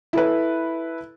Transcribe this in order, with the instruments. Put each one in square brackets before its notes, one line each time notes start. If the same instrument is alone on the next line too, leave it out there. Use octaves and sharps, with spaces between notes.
[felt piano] E4 A4 B4